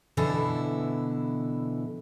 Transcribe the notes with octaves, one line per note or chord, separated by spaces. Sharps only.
B2 D3 E3 E4